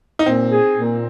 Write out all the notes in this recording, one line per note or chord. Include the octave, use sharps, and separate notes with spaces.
D#4
A#2 C4
G#4
A#2